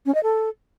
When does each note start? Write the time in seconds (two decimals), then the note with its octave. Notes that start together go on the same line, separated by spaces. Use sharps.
0.06 C#4
0.15 D#5
0.23 A4